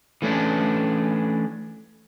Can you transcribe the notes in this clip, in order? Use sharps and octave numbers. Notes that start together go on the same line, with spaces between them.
E3 A3 C#4 D4